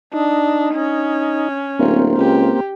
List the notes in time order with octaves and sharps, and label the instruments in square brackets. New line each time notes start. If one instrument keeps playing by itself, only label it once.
[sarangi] D4 [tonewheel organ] D#4
[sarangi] C#4
[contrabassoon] D1 [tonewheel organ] A#3 C4
[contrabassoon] C#2 [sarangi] G4